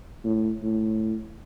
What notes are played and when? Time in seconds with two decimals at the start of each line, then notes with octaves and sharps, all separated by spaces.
0.25 A2
0.63 A2